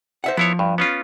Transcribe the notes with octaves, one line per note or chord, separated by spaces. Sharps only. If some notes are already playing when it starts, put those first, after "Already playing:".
C5 E5 F#5
F3 B3 E4 C#5
G2
B3 C#4 F4